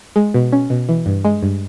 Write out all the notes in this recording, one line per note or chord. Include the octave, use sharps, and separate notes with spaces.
G#3
B2
C#4
B2
E3
G2
G#3
G2